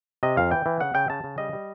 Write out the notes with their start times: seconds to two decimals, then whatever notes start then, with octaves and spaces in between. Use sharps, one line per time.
0.23 C3 D#5
0.37 F2 F5
0.51 E3 G5
0.66 E3
0.81 C#3 F#5
0.95 C#3 G5
1.10 C#3 A5
1.24 C#3
1.38 G3 D#5
1.53 G3